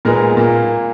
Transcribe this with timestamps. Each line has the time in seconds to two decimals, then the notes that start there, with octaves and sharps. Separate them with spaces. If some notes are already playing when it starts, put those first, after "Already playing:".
0.05 A#2 G#3 B3 A#4
0.37 A#2 A#3